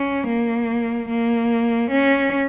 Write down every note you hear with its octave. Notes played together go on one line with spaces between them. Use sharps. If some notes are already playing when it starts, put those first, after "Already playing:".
Already playing: C#4
A#3
A#3
C#4